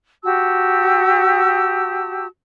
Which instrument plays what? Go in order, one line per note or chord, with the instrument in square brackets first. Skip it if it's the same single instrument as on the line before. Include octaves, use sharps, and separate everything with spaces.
[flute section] F#4 G4 A5 E6